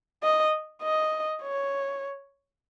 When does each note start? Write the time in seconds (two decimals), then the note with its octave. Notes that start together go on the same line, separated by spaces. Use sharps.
0.23 D#5
0.82 D#5
1.42 C#5